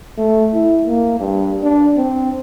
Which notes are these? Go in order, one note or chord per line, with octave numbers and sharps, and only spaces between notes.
A3
E4
A#3
G2
D4
C4